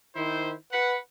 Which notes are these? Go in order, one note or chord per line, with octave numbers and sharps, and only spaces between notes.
D#3 E4 C5
B4 F#5